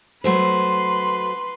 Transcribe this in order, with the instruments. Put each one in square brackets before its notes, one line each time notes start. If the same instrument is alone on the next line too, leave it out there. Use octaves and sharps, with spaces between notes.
[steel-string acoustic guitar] F#3 A3 C5 [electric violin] B4 C6